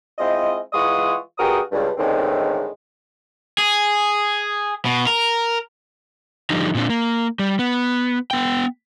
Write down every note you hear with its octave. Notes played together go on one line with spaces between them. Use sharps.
G#3 C4 E4 F4 C5 D#5
E3 G#3 F4 F#5 C#6 D#6
G2 F#4 G#4 A#4 G5 D#6
C#2 G2
E2 A2 D3 D#3 G#3 C4
G#4
B2
A#4
D3 F3 G3 D#4
A#2 C4 D4
A#3
G3
B3
B3 G5